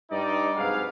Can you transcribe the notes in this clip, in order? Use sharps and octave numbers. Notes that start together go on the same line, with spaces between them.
G2 D#4 D5
G#2 C3 F#3 G#4 B4 F5